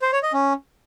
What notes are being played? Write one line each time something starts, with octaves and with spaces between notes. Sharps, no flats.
C5
C#5
D#5
C#4